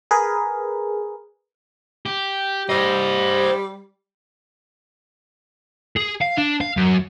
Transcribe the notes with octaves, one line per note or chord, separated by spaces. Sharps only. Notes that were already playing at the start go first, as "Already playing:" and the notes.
G#4 A#4 B4
G4
G3 C5 D#5
G#4
F5
D4
F5
F#2